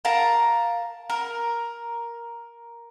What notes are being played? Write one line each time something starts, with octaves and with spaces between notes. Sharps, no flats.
A#4 F5 A5 A#5
A#4